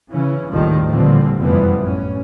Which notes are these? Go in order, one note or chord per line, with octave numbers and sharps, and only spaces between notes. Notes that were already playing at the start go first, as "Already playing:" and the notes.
C#3 E3 C#4
G#1 D#2 A2 D#3 F3 G3
A#2 D3 E3 F3 G3 C4
F1 F#2 E3 F3 G3 B3
A1 C#4